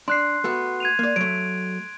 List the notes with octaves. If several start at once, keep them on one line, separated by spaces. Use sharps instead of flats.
D4 C6 F#6 C7
A3 B3 F#4
G#6 D#7 F7
A#3 D5
F#3 A3 D7